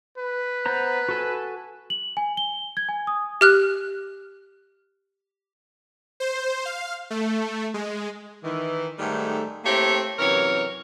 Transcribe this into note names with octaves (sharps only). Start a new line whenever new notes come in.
B4
B3 C5 A#5
F#4 A4 G#5
F#7
G#5
G7
G#6
G#5
D#6
G4 F6 F#6
C5
F5
A3
G#3
D#3 E3
G#2 D#3 G3 A3
A3 A#3 C4 E4 G4 C#5
F#2 C3 E3 A#4 C#5